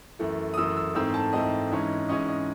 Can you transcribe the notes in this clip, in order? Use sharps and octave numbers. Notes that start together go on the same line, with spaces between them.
F#2 E3 A3
D#6
F#2 E3 A3 E6
E6
G#2 E3 A3 C4 E6
A5
G#2 E3 A3 C4 D#5
G#2 E3 G#3 C#4
G#2 E3 G#3 C#4 D#5
D#5